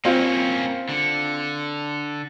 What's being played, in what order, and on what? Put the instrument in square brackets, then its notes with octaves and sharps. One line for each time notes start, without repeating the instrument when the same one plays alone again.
[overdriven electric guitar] A#3 C#4 [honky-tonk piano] C4 F4
[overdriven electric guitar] D3